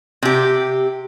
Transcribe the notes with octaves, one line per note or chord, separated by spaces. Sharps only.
C3 G4